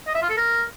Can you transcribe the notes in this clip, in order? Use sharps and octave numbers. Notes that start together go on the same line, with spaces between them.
D#5
E5
F4
A4
A#4